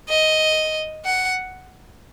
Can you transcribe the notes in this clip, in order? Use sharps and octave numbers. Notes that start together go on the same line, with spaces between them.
D#5
F#5